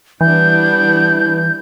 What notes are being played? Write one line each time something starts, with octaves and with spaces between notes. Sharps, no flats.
E3 G3 B3 D4 G6